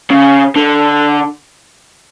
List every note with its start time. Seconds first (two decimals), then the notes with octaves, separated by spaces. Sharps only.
0.10 C#3
0.56 D3